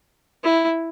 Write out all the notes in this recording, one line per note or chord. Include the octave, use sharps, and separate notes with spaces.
E4